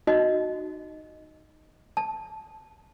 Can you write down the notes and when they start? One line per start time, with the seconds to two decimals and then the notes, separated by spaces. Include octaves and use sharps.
0.07 D#4 F#4 D#5
1.97 A5